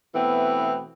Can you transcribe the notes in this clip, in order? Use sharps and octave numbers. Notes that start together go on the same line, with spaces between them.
B2 E3 A3 B3 C4